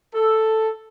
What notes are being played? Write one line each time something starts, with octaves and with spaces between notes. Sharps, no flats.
A4